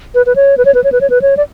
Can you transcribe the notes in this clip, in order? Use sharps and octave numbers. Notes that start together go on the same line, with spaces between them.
B4
B4
C#5
B4
C#5
B4
C#5
B4
C#5
B4
C#5
D5